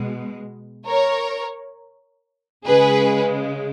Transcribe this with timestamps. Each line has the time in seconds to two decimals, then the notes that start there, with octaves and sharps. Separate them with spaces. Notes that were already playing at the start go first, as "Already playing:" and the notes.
Already playing: B2 G#3
0.87 A#4 C#5
2.66 C#3 G#3 G#4 B4